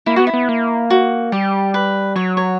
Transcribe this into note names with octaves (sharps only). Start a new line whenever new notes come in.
A#3 E4
B3 F#4
E4
B3
A#3
F#4
G3 G4
B4
F#3 C#5
C#5